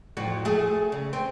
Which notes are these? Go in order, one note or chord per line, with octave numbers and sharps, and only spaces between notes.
F2 A2 F#4
A3 G#4
C#3
C4